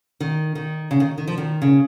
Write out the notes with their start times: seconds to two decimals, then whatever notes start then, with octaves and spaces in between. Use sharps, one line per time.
0.20 D#3
0.55 D#3
0.91 C#3
1.00 D#3
1.18 D#3
1.28 F3
1.38 D#3
1.62 C#3